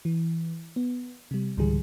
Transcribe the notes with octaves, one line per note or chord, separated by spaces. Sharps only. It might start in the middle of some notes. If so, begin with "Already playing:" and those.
E3
B3
C3 G3
C#2 G#2 D3 E3 G3 G#4